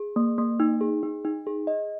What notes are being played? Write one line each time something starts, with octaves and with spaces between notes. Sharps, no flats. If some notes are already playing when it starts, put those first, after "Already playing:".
Already playing: G#4
A#3
A#3
D#4
G#4
D#4
D#4
G#4
D#5